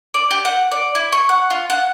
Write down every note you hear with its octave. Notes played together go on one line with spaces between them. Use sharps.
D5
G4
F#5
D5
E4
C#6
F#5
F4
F#5